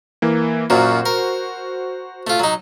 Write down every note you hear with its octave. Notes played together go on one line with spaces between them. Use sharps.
E3 A#3
F#2 A#2 F#3 F#4 C5
A#4
A3 F4
F#3 D#4